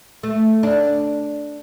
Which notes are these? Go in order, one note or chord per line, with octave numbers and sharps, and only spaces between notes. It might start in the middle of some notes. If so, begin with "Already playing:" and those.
A3
D4